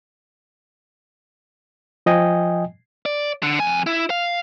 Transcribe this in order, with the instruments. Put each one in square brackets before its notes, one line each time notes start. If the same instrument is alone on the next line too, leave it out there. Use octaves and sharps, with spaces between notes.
[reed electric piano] F3 D#5 G5 G#5
[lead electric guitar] D5
D3
F2 G#5
E4
F5